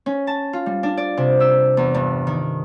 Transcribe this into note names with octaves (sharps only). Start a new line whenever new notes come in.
C#4
A5
F4
G3
D4
D5
C3
E6
E2
G2
D#3